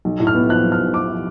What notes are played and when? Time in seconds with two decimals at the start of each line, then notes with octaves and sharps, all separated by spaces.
0.05 B1
0.20 A2
0.27 F6
0.35 B3
0.49 F3 F#6
0.64 B1
0.72 F6
0.80 A2
0.94 B3 D6
1.10 F3